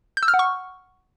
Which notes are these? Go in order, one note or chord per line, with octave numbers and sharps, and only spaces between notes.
G6
E6
F6
F#5
C#6